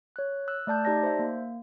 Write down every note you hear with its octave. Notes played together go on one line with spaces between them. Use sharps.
C#5 F#6
E6 F#6
A3 D5 A5 G6
D#4 G4 D5 A5 A#6
C5 E5
A#3